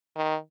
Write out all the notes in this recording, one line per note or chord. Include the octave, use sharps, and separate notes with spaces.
D#3